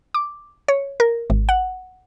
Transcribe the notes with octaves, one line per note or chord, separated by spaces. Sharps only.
D6
C#5
A#4
G#1
F#5